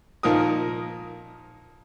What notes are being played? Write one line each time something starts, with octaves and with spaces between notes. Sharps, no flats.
A#2 F3 D#4 A#4 D#6